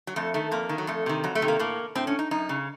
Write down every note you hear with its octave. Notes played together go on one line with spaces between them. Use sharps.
F#3
F2 A3
D#3 A3
F2 A#3
D#3
F#3
F2 A3
C3 D#3
F2 F#3
A3
C3 D#3
A#3
A2 A#3
A2 C4
C#4
D#4
F#2 D#4
C#3